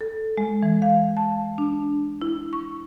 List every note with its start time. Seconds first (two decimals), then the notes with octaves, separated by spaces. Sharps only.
0.01 A4
0.37 G#3
0.63 E3
0.82 F5
1.17 A5
1.58 D4
2.22 E4
2.53 C#6